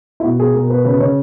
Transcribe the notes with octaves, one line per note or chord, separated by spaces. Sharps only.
E4
B2 F#4
B2 G#4
B2 A#4
B2 B4
C#3 B4
C#3 C#5